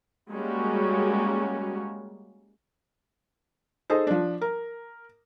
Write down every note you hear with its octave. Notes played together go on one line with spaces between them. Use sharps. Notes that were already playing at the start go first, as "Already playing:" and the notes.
G3 G#3 A#3 C#4 F#4
D#4 G#4 A4 C5
F3 D4
A#4